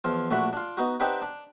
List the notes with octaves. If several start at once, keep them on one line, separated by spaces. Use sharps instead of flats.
E2 F3 F4
A#1 A3 D4 F#4 F#5 B5
D4 F4
B3 D#4 F#4
C4 D4 D#4 G4 B4 F#5
D4